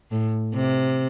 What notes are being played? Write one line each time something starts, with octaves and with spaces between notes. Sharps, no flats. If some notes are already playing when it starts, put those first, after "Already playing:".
A2
C3